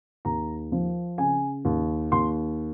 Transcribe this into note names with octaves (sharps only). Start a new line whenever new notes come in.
D#2 A#5
F3
C#3 G#5
D#2
D#2 C6